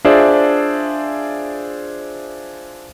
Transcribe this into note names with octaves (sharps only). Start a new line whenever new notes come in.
D4 F4 G#4 C5 D5 E5